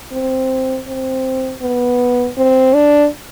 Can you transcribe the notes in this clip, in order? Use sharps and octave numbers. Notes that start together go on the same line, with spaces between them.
C4
C4
B3
C4
D4